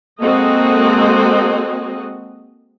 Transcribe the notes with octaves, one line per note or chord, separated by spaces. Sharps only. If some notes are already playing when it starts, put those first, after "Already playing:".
G#3 A#3 C4 F#4 A4 D#5